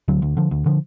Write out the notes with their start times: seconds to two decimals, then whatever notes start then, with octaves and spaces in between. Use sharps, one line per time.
0.08 D2 D3 F#3
0.22 D2
0.37 D3 F3
0.51 D2
0.66 D3 F3